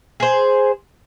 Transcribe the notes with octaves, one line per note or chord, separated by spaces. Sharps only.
G#4 C5